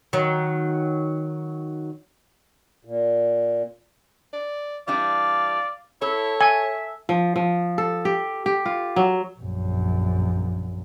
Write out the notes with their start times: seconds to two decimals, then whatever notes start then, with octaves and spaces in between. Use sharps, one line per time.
0.13 D#3 F#3
2.85 A#2
4.33 D5
4.88 E3 G3 D4 D5 F5
6.02 E4 A4 C#5
6.41 E5 G#5
7.09 F3
7.36 F3
7.78 A4
8.05 G4
8.46 G4
8.66 F4
8.96 F#3
9.40 A#1 F#2